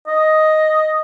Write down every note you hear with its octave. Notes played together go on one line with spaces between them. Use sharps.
D#5